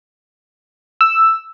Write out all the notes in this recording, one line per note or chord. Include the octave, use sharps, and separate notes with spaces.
E6